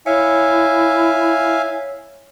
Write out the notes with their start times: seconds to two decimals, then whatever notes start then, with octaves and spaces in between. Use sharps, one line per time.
0.06 E4 C#5 E5 F5 G#5